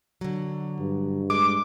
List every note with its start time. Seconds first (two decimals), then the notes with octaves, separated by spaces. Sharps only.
0.21 D3 F#3
0.80 G2
1.30 G#3 D6